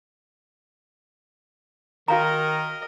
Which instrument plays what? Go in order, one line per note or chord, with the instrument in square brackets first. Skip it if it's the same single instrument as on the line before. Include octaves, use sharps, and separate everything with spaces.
[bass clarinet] D#3 [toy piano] F#4 F5 A#5 [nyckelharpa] A#4 D#5